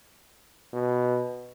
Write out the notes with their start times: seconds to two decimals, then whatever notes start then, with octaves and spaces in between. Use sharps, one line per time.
0.73 B2